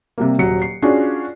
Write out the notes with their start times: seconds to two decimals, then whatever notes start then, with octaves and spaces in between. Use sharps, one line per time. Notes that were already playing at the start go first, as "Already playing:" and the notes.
0.18 C3 G3 A#3
0.39 D#1 F#3 C#7
0.62 C7
0.82 C#4 D4 F4 F#4 G#4